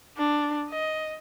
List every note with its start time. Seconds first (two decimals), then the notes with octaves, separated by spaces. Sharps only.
0.17 D4
0.70 D#5